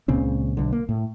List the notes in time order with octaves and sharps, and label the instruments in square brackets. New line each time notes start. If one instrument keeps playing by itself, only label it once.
[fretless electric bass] C#2 A#2 C#3 C4
B1 D3
A#3
A2